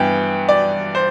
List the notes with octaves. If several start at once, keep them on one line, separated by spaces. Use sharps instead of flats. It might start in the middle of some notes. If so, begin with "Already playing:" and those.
Already playing: G2 E3 B3 G5
D5
C5